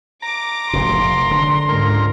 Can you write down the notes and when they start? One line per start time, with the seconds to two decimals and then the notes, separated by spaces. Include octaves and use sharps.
0.22 A#5 D6
0.73 F1 A#2 C6
1.31 D3
1.69 C#2 G#2 A#4